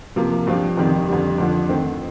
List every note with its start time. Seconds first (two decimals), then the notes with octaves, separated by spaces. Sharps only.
0.16 C3 F3 A#3
0.47 G2 F3 C4 F4
0.77 F2 C3 D#3 G3
1.08 F2 D3 G3
1.38 F2 D3 F3
1.69 D#3 A3 C4